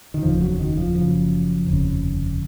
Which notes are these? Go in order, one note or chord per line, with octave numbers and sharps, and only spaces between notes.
D#3
F1 D#2 C#3 F3
F#3
D#3
F3
F#1 F#2 C#3 F3
F1 D#2 C#3